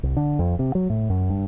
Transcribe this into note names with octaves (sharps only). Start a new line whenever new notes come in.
C2
D3
F2
C3
F#3
A2
F#2
G2